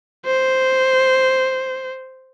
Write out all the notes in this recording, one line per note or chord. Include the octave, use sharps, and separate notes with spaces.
C5